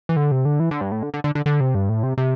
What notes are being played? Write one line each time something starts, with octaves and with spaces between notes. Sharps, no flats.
E3
D3
C3
D3
E3
D3
G2
A2
D3
D3
D3
D3
D3
C3
G2
A2
C3
C3